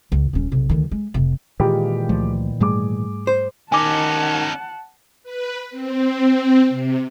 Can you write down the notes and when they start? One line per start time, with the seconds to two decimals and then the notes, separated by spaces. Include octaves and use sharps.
0.12 C#2
0.33 D#1 C#4
0.52 B1 C3
0.69 D2 D#3
0.91 G#3
1.14 F1 C3
1.60 A#2 D#3 E3 G#3 F4 G4
2.09 C#2 F3 A3
2.60 G#2 G3 A3 G#4 D6
3.27 C5
3.72 D#3 C#4 D#4 F#5 G#5 A5 D6
5.23 B4
5.71 C4
6.69 C3